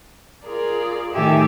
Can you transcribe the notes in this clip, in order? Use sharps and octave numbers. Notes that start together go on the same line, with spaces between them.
F4 G#4 A#4 D5
A2 D#3 G4 A4 E5 G#5